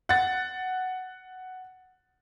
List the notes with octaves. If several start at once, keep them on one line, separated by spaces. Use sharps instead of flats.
F#5 A6